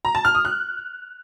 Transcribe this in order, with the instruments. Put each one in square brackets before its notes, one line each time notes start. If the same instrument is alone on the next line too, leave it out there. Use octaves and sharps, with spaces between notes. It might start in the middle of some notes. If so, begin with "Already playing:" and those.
[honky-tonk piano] A#5
A5
F6
D#6
F#6